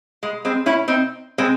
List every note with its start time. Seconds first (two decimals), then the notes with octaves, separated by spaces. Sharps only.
0.23 G#3
0.45 G#3 C4
0.66 C#4 E4
0.88 C4 D#4
1.38 G#3 C4